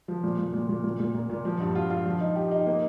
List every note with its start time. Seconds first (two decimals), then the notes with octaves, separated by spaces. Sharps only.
0.08 F3
0.24 A#2
0.38 A#2
0.54 A#2
0.69 A#2
0.84 A#2
1.00 A#2
1.15 A#2
1.30 A#2
1.45 F3
1.60 G2
1.75 F4
1.90 F4
2.06 F3
2.21 D#4
2.36 G4
2.51 D#4
2.66 A#3